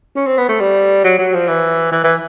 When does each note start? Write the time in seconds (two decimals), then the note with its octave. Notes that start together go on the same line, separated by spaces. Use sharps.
0.16 C#4
0.27 C4
0.38 B3
0.49 A3
0.60 G3
1.04 F#3
1.19 F#3
1.34 F3
1.48 E3
1.92 E3
2.04 E3